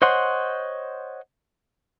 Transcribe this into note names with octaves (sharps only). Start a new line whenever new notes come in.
C5 C#5 D#5 F#5 C6